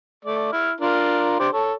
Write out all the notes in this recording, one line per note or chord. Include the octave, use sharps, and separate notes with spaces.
A3 D5
E4 F6
D4 F4 A#4
D4 G4 C5
A4 C#5